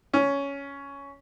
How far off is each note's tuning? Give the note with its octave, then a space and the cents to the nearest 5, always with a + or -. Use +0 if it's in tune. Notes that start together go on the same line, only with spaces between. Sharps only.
C#4 +10